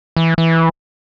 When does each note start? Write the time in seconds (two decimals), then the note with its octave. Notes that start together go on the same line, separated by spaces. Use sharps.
0.17 E3
0.38 E3